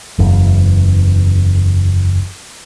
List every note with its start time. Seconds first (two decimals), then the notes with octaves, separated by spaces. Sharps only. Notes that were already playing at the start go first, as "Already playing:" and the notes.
0.19 F#1 E2